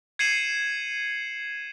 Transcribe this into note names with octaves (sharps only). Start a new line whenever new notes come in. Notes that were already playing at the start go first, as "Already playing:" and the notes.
G#6 C7 C#7 D#7 E7 F#7